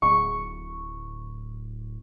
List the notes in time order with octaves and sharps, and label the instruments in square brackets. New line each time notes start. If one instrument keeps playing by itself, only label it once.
[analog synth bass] D1 [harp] C#6